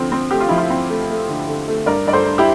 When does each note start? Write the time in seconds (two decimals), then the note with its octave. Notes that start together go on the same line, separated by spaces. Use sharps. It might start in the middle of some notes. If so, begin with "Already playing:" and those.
Already playing: D3 F3 C4
0.12 C4
0.31 A3 G4
0.40 F4
0.48 F3 E4
0.58 F4
0.70 C4
0.89 A3
1.10 A3
1.29 D3
1.48 D3
1.68 A3
1.86 G2 A#4 D5
2.07 G2 D5
2.13 A4 C5
2.26 G2
2.38 E4 G4